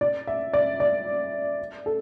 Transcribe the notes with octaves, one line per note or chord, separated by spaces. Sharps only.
D5
E5
D5
D5
A4